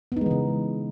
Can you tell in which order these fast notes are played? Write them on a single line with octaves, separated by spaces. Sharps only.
B3 D#4 G#3 E3 C#3